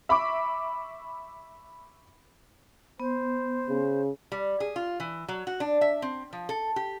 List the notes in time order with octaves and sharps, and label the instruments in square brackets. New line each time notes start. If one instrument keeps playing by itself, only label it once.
[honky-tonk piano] E5 B5 C#6 D6
[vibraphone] B3 [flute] C5
[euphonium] C#3
[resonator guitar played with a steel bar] G3
G#4
F4
E3
F#3
F#4
D4
E5
C4
F3
A4
G4